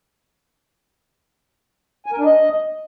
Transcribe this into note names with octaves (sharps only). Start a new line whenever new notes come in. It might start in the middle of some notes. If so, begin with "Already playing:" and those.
G#5
A#4
D4
D#5